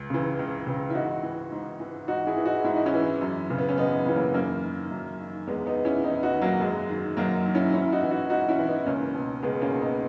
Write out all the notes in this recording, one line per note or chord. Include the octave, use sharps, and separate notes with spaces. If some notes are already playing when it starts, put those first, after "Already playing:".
Already playing: C#2
C#3 E3
C#2
C#3 E3
E4
G#2 D#4 F#4
E3
G#2
E3
G#2 D#4 F#4
E4 G#4
E3
D#4 F#4
G#2 E4
D#4
C#4 E4
E3
F#2
C#3 E3
B3
C#4
F#2 B3 D#4
C#3 E3
A#3 C#4
F#2 A#3 C#4
D#3
F#2
D#3
E2 G#3 B3
B3 D#4
D#3
C#4 E4
E2 B3 D#4
D#4 F#4
D#3
F#3 A#3
F#2 G#3
D#3
F#2 F#3 A#3
D#3
C#4 E4
G#2 C#4 E4
D#4 F#4
E3
D#4 F#4
G#2 D#4 F#4
C#4 E4
E3
B3 D#4
C#2 A#3 C#4
B2
C#2 G#3 B3
A#3 C#4
B2
B3 D#4